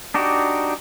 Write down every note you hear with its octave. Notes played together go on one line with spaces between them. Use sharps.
D4 D#4 F#4 G4